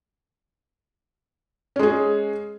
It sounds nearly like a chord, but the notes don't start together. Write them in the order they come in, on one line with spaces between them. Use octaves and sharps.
C#4 G#3 G#4